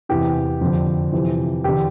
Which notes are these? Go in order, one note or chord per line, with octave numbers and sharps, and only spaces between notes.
E2 C3 E3 G4
F2 D3
F2 C3 E3
E2 D3 G4